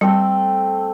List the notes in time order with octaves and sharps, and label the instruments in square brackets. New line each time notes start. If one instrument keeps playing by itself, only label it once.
[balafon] G3 [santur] A3 C4 A4